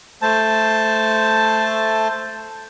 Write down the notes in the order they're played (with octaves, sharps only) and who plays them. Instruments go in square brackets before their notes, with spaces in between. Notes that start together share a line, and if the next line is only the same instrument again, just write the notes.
[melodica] A3 C5 A5